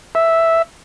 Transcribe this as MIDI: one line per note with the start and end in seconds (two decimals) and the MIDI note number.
0.15 0.62 76